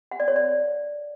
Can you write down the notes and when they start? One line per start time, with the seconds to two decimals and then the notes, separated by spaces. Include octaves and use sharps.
0.11 F#5
0.20 D5
0.28 C#5
0.36 D5